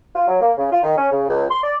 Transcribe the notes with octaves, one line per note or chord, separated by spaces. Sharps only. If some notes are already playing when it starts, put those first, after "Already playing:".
F4
F#3
A#3
C#3
F4
D#3
C#4
C#3
C#2
C6
D5